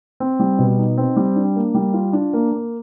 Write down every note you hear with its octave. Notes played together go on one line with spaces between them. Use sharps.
C4
G3
B2
D#4
C4
G3
D4
A#3
G3
F4
D4
A#3
A#3